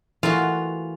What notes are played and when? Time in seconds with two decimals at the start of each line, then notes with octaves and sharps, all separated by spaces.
0.23 E3 A3 A#3 F4 F#4